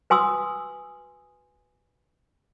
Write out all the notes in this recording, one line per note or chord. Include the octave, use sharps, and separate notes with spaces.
B4 G#5 C6 D#6 E6